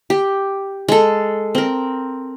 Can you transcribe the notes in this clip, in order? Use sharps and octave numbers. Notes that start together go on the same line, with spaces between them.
G4
G#3 A4
C4 A#4